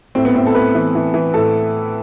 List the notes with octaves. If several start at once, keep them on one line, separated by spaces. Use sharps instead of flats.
A2 C4
B3
A2 C4
A4
A2 B4
E3
E3
E3
A2 A4